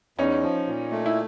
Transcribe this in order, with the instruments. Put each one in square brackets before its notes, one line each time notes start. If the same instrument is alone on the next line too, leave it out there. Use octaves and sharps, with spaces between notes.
[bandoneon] E2 [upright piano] C#4 D#4
[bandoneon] F3
A#2
A3
[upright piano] E4